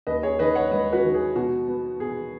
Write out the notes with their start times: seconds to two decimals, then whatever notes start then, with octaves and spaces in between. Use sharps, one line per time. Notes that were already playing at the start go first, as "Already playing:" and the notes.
0.07 D#2 B4 D#5
0.23 G#4 C#5
0.39 D#3 B4 D#5
0.55 C#5 F#5
0.71 G#3 B4 D#5
0.93 F#4 B4
1.04 D#3
1.14 G#4
1.36 B2 F#4
1.68 B3
2.00 B2 G#4